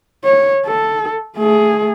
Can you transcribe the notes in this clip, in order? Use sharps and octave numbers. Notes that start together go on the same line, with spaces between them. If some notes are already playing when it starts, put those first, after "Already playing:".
C#5
A4
A3 G#4